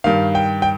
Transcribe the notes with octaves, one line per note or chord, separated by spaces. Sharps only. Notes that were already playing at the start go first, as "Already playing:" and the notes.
G2 D#3 F5
G5
G5